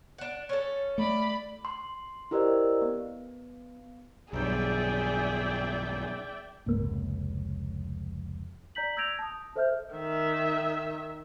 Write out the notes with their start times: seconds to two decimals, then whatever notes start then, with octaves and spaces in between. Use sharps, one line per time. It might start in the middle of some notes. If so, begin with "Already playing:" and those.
0.18 D4 F#5
0.49 C#4 A4
0.98 A3 D5 B5
1.65 C6
2.31 E4 G4 A#4 C5 D5 D#5
2.82 B3
4.33 B1 G2 G#4 D5 E5 G5
6.66 F1 C#2 G#2 A#3
8.75 D5 A#5 G6 B6 F#7
8.97 E6 G6 G#6 A#6 D7 F7
9.19 A5 D#6
9.56 A4 C5 D#5 E5 F6 G6
9.94 D#3 E5